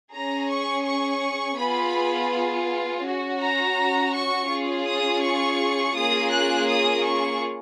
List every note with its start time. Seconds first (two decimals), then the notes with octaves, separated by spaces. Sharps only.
0.12 C#4 G#4 A#5
0.48 C#6
0.84 C#6
1.58 B3 F4 G#4 B5
3.04 C#4 F#4
3.40 A#5
4.12 C#6
4.49 C#4 F4 G#4
4.86 D#6
5.21 C#6
5.95 A#3 C#4 F4 G#4 D#6
6.31 F#6
6.68 D#6
7.04 C#6